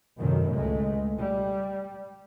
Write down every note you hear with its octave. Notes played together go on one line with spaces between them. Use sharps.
F#2 A2 C3 D#3
C#2 G#3 A3
G3